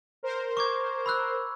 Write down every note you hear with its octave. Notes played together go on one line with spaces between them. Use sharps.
A#4 C5
C#6 D6 G#6
B5 E6 F#6